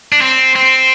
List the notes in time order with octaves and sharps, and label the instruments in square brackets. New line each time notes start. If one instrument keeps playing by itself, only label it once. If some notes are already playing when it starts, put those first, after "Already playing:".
[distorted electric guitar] D4
C4
C4